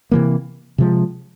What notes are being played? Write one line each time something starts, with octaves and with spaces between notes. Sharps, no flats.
C3 E3 A#3
C3 F3 G#3